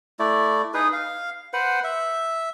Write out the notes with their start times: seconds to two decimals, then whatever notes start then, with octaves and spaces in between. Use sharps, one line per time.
0.19 A3 E4 D5
0.74 D#4 G#4 B4
0.93 F5
1.53 B4 C5 F#5
1.84 E5